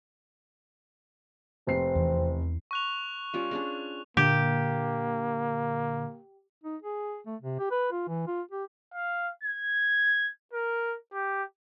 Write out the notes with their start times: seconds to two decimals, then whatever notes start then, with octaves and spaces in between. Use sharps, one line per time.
1.67 F1 C4 C7
1.95 E2 E3
2.71 C#6 F#6 F7
3.34 G3 C#4 F4
3.51 C#4 D4 G#4
4.17 A#2 D3 A#3 G4
6.64 D#4
6.82 G#4
7.27 A3
7.42 C3
7.59 G4
7.71 B4
7.91 F4
8.08 E3
8.27 F4
8.51 G4
8.94 F5
9.43 G#6
10.53 A#4
11.13 G4